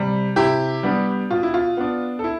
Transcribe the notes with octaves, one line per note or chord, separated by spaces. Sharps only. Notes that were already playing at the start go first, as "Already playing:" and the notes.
Already playing: C3 G3
C3 E4 G4
G3 B3 D4
B2 F4
E4
F4
B3 D4
A4
E4